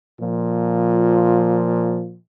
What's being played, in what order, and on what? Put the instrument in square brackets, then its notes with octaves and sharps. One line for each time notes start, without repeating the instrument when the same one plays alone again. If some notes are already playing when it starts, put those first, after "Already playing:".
[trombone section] A#2 F3